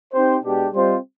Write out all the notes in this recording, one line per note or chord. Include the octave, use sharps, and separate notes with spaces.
C4 D#4 G4 C5
B2 G#3 D4 G4
G3 C4 F4 C5 D#5